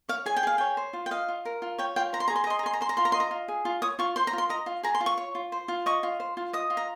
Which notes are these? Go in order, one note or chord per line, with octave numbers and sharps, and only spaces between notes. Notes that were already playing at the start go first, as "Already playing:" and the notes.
C#5 F5
G#4 G#5
G5
G#4 F5
C#5 G5
C5
F4
G5
D#5 F5
F4
A#4
F4
C#5 G5
F4 G5
C5 A#5
C6
G#4 A#5
C6
A#5
D#5 C6
A#5
G#4 C6
A#5
C5 C6
A#5
F4 C6
A#5
D#5 C6
A#5
F4
G#4
F4
C#5 D#6
F4 C#6
C5 C6
A#5
F4
C6
D#5 A#5
F4
G#4 A#5
C6
F4
C#6
C#5
F4
C5
F4
D#5 C#6
F4
C5
F4
D#5 D#6
F4
A#5